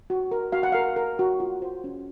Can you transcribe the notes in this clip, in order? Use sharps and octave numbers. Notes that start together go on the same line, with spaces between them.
F#4
A#4
F#4 F5
F#5
A#4 F5
A#4
F#4
F4
C5
C#4